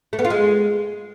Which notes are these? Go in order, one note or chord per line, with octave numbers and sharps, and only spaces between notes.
A3
B3
F4
G#3